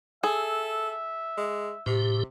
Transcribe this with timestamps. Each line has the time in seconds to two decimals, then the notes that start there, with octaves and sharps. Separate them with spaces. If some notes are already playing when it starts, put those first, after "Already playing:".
0.23 G#4 A4 E5
1.38 G#3
1.86 A2 C3 G4